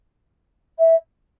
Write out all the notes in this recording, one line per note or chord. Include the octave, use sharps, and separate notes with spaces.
E5